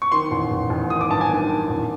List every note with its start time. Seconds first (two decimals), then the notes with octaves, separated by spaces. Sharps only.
0.02 C#6
0.12 D#3 C6
0.31 A1
0.51 A1
0.70 A1
0.90 D#3 D#6
1.01 D6
1.10 G2 A5
1.21 G#5
1.30 D#3
1.49 D#3
1.70 A1